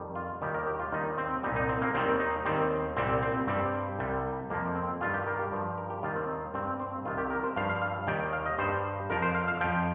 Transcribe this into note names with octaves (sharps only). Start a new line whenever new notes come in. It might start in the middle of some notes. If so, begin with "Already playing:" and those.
Already playing: F2 D#3 G3
F4
D#2 D#3 G3 G4
A#4
G4
F4
D#2 D#3 G3 D#4
C4
C2 A#2 G3 D#4
D#4
C4
A#3
D#2 D#3 G3 C4
D#4
D#2 D#3 G3 C4
C2 A#2 G3 C4
C4
G2 G3 C4
C2 C3 G3
F2 F3 A#3
C4
G2 D#3 G3 F4
G4
A#4
G4
G2 F3
A#4
G4
D#2 D#3 G3 F4
C4
D#4
G2 G3 C4
C4
C2 C3 D#3 F4
G4
A#4
C5
G2 F3 F5
F5
F5
D#2 D#3 G3 G5
F5
D#5
G2 G3 C5
F2 F3 A#4
C5
F5
F5
F2 F3 G5